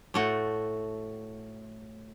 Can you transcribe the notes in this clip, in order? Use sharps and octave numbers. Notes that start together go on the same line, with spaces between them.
A2 A3 F#4